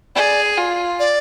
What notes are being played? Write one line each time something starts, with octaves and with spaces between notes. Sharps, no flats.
G#4 D5
F4
D5